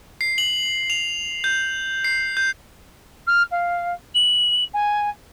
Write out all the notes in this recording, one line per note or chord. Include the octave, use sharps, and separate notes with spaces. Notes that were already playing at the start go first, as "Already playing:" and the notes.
C7
F#7
F7
G6
C7
G6
F6
F5
F#7
G#5